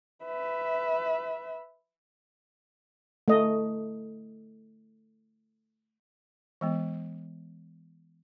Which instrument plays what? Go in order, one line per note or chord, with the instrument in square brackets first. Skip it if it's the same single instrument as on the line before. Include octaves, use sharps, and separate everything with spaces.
[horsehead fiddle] B4 E5
[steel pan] A3 D#5
[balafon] E3 G#3 B3